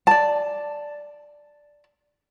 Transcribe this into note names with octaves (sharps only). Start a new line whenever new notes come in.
D5 A5